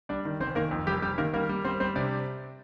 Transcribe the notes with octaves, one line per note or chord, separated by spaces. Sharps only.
G3 D4 D5
D#3
F1 C4 C5
D#3 A#3 A#4
F2
F1 G3 G4
G3 G4
D#3 A#3 A#4
G3 A#3 A#4
G3
G3 C4 C5
G3 C4 C5
C3 D4 D5